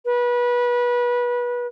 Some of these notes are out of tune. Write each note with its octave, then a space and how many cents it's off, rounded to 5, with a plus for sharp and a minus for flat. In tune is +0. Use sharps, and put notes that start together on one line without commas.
B4 -25